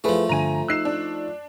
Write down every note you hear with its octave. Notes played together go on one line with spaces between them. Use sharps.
F3 A3 E4 G#4 B4
G2 D3 G#5 A#5 D#7
D#4 E6 F#6 C7 E7
D4